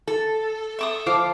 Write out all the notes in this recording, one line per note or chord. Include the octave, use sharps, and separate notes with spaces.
A4
E5 D6 D#6
F3 F5 D6